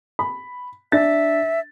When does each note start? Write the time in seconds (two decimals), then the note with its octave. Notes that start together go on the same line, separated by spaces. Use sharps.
0.19 B5
0.92 D4 E5 A6